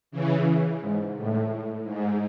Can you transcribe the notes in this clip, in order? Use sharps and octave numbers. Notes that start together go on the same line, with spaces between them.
C#3 E3
G#2
A2
G#2